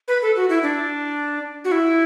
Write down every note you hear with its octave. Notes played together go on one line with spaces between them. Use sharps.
B4
A4
F#4
E4
D4
F#4
E4